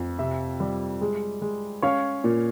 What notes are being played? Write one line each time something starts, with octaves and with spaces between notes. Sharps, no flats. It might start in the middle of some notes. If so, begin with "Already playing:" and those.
Already playing: F2
C3 E5
G3
G#3
G#3
C#4 C#5 F5
A#2